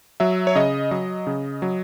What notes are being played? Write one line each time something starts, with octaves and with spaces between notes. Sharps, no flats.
F#3 E5
C#5
C#3 D#5
F#3 D#5
C#3
F#3